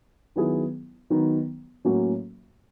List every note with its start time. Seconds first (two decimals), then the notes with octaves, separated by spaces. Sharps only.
0.36 D#3 F#3 B3 E4 G#4
1.10 D#3 F#3 B3 D#4
1.85 A2 F#3 A#3 C#4 F#4